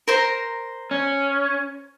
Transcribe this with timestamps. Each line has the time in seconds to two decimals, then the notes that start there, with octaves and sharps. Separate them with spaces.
0.08 A#4 C5 A#5
0.91 C#4